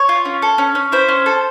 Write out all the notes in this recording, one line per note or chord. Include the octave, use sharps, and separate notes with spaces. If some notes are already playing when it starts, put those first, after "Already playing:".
Already playing: C#5
F4
C#4
A4
C#4
C#4
E4 C5
C#4
A4